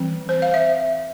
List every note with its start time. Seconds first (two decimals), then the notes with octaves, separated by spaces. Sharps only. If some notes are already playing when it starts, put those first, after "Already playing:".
Already playing: E3 G3 C4
0.29 C5
0.42 F5
0.54 E5